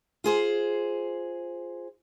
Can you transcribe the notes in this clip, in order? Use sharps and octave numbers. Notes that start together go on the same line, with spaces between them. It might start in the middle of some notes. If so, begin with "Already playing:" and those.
F4 G#4 C5